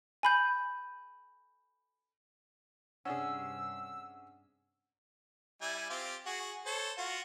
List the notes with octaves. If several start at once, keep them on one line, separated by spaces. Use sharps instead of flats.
G#5 B5 G6
G2 C3 C#4 D4 G#4 F#5 E6
G3 E4 G#5
C4 F4 G4
F#4 G#4
A4 C5 C#5
F4 F#4